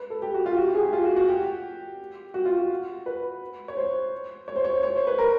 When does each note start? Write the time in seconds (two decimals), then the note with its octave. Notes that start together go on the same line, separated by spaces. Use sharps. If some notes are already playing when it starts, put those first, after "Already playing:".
Already playing: B4
0.10 A4
0.22 G4
0.34 F#4
0.46 F4
0.52 G4
0.57 F#4
0.67 G4
0.75 G#4
0.85 G4
0.93 F4
1.05 F#4
1.17 F#4
1.28 G4
2.34 F#4
2.45 F4
2.57 F#4
3.06 B4
3.68 C#5
3.77 C5
4.48 C#5
4.56 C5
4.64 C#5
4.83 C#5
4.95 C5
5.07 B4
5.19 A#4